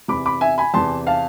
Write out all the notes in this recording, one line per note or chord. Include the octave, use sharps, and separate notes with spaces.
E2 C3 E3 B5 D6
B5 D6
E5 G#5
G#5 B5
E2 C3 E3 A5 C6
F5 A5